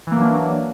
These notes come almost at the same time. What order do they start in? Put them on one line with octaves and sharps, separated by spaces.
E3 A#3 F#3 D4